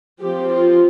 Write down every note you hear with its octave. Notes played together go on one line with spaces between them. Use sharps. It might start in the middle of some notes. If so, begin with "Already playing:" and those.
F3 C4 G4
F4